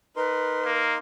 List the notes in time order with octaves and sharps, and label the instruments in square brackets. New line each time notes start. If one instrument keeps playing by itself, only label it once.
[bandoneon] D#4 A#4 C6 [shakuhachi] B4
[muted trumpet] A#3